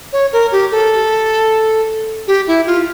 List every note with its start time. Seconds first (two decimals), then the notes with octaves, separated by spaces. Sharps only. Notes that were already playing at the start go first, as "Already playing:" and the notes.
0.13 C#5
0.33 A#4
0.52 G4
0.72 A4
2.27 G4
2.47 E4
2.66 F4